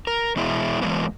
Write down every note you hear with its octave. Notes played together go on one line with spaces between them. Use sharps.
A#4
E2 B2 G#3 E4
E3 F#3 G#3 A#3 B3